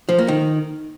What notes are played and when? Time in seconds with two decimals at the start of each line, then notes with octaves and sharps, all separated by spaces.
0.09 F3
0.18 A#3
0.28 D#3